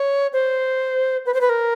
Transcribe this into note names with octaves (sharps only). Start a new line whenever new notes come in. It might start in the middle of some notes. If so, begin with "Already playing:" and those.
Already playing: C#5
C5
B4
C5
B4
A#4